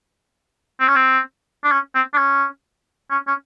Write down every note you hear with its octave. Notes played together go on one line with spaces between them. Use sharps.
C4
C#4
C4
D4
C#4
C4
D4
C#4
C#4
C#4